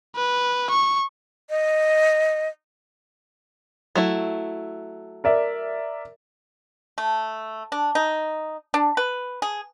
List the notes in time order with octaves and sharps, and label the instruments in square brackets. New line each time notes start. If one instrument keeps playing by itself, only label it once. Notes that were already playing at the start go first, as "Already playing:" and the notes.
[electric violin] B4
C#6
[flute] D#5
[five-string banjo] F#3 A3 E4
[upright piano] A#4 D5 E5
[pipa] A3
D4
D#4
D4
B4
G#4